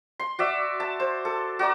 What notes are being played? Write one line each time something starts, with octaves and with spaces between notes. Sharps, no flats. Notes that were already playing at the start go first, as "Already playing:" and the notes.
C6
F#4 D5 E5
A5
C5
A4
F#4 D5 A#5